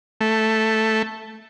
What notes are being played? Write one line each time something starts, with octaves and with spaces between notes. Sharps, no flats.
A3